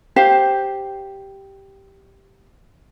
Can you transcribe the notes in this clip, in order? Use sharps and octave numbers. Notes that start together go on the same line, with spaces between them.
G4 C5 F5